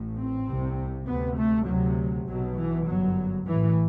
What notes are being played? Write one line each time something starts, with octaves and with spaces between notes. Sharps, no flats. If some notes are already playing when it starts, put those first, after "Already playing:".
Already playing: A1 A2
C4
C2 C3
D2 C3 B3
A3
D2 C3 F#3
B1 B2 F#3
E3
G1 F#2 F#3
A1 A2 E3